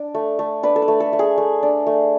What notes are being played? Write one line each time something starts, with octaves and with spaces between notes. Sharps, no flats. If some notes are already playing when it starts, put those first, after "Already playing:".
Already playing: D4
A3
A3
D4 B4
A4
B4
A3
A4
A3
G#4
A3
D4
A3